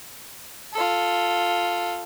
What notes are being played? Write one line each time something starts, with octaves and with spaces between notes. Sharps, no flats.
F4 A4